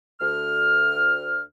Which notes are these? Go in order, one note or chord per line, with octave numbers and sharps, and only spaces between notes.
D2 F6